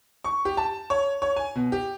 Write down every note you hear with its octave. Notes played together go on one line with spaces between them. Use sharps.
C#6
G4
A5
C#5
C#5
G#5
B2
G4